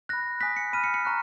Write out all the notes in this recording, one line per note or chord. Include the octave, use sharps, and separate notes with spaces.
B5 F#6 A#6
G#5 D#6 F#6 B6
C#7
B5 F6 D#7
C#7
C#7
A#5 C#6 F#6